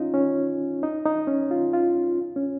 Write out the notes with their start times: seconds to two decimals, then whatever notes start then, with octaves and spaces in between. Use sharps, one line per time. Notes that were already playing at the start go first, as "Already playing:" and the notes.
Already playing: C#4 D#4 F4
0.14 C#4
0.83 D#4
1.05 D#4
1.27 C#4
1.51 F4
1.73 F4
2.36 C#4